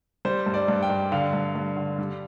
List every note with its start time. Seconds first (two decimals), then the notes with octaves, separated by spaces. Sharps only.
0.25 G3 C5
0.46 G2
0.54 D5
0.68 G2
0.83 G5
0.90 G2
1.12 D3 F5
1.33 G2
1.55 G2
1.77 D3
1.99 G3